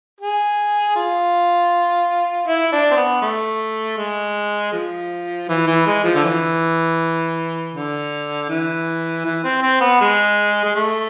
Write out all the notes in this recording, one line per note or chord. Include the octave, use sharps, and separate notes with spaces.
G#4
F4
E4
D4
C4
B3
A3
G#3
F3
E3
E3
G#3
F3
D3
E3
D3
E3
E3
C4
C4
B3
G#3
G#3
A3